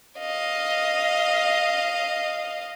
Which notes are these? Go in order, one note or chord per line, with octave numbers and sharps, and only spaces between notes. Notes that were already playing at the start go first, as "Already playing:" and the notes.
D#5 F5